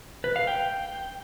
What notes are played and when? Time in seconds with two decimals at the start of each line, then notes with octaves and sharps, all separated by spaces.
0.24 B4
0.36 F5
0.47 G5